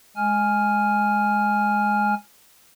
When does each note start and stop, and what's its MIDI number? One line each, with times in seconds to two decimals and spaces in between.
0.16 2.14 56
0.16 2.14 80
0.16 2.14 89